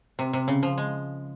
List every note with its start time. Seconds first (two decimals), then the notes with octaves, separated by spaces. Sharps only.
0.19 C3
0.33 C3
0.48 C#3
0.63 F3
0.78 G#3